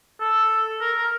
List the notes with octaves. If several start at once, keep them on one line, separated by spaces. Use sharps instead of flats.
A4
A#4
A#4